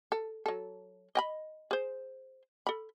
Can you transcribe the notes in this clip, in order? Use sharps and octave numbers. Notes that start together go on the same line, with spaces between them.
A4
F#3 A4
D#5 G5 B5
G#4 C5
A4 B5